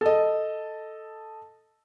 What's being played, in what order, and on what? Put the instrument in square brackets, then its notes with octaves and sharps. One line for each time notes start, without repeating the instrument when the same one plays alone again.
[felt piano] A4 D#5